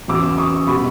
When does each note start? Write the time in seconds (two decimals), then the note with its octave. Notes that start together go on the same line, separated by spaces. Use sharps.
0.08 E2 C#3 F#3 D6 E6
0.38 C#6 D#6
0.67 B2 G3 B5 C#6